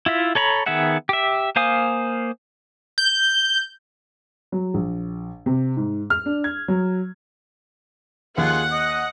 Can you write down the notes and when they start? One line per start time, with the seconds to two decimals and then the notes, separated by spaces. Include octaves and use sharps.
0.06 E4 F4 E5
0.35 A4 C#5 A#5 B5
0.66 D#3 B3 G#4 E5 F#5
1.09 G4 E5
1.56 A#3 C5 F5 G#5 D#6
2.98 G6
4.52 F#3
4.74 A#1
5.46 C3
5.77 G#2
6.10 F6
6.26 D4
6.44 G#6
6.68 F#3
8.38 D#2 F4 G#4 F#5
8.73 D#5 D#6